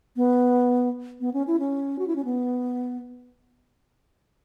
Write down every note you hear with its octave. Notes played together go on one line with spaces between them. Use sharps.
B3
B3
C#4
E4
C#4
F#4
E4
C#4
B3